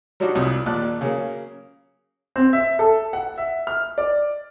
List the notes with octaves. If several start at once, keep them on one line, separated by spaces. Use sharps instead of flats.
F#3 G3 D4 D#4 F#4
C2 F2 D#6
A#1 D#2 D5 F#6
C#3 F#3 A#3
C4
E5
A4
F#5
E5
F6
D5